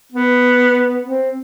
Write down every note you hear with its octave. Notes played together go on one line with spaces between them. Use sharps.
B3
C4